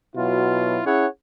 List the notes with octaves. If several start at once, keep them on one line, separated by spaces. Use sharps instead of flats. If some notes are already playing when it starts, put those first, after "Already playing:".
B2 F#3 E4 F4
C#4 E4 G#4 C#5 F#5